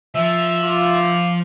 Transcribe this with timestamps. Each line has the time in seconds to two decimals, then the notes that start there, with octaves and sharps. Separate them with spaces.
0.15 F3 E5
0.61 F4 D6